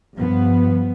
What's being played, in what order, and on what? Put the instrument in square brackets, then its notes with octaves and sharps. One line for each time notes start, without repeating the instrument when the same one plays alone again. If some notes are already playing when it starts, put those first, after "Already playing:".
[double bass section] G2 F3 B3